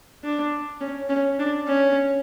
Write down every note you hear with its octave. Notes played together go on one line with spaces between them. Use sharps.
D4
C#4
C#4
D4
C#4